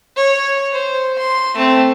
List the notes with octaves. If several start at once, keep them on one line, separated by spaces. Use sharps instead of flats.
C#5
C5
C6
A3 C4